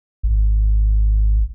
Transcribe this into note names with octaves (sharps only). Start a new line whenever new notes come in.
G#1